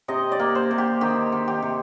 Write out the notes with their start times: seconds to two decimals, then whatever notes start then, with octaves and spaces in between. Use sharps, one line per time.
0.08 C3 D#5
0.32 D5
0.39 A#3
0.55 C5
0.71 C3
0.78 G4
1.01 D#3 G4
1.32 D#3
1.48 G4
1.62 C3